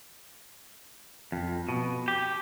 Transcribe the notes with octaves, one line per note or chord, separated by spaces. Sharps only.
F2
B2
G4